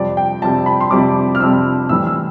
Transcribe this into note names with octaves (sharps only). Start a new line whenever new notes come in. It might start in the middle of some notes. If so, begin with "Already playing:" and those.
Already playing: F2 C3 G3 D5
G5
F2 C3 G3 A5
B5
C6
F2 C3 G3 D6
F6
F2 C3 G3 E6
A2 E3 G3 E6
E6